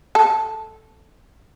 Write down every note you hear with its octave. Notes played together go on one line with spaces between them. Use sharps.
A4